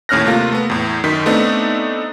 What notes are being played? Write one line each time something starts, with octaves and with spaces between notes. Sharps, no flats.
D#2 A2 C#4 F6 F#6 A#6
C3 A3 A#3 F4
A3 B3
E2 A2
F#2 D#3 D#4 B6
A3 B3 C4 D4 D#4